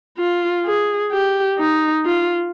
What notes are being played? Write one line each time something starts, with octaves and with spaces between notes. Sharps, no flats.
F4
G#4
G4
D#4
F4